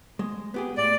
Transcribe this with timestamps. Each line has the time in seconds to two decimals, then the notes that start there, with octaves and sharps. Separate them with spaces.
0.19 G#3
0.54 B3 G4 G#4
0.77 A2 D5